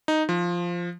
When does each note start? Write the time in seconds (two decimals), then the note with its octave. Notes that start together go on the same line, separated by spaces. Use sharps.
0.08 D#4
0.29 F3